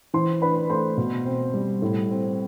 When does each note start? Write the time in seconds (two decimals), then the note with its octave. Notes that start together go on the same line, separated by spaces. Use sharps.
0.14 E3 C5 C6
0.41 D4 B4 B5
0.70 A3 C5 C6
0.97 B2
1.26 C4
1.54 G3
1.82 A2
2.10 C4